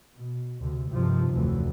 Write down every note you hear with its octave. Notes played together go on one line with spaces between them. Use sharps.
B2
D2 C3
G2 C3 D#3 F3
F1 D2 E3